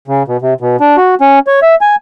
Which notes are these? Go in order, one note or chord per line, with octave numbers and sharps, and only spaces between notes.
C#3
B2
C3
B2
D4
F#4
C#4
C#5
E5
G#5